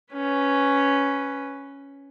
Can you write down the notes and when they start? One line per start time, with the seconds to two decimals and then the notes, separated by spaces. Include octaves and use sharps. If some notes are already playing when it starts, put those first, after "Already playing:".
0.13 C#4 B4